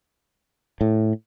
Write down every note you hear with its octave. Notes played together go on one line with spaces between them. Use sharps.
A2